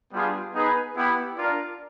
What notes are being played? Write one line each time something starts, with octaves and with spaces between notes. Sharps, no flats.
G3 B3 D4 F4 G#4
B3 D#4 G#4 B4
B3 E4 G4
D4 F4 A#4 D5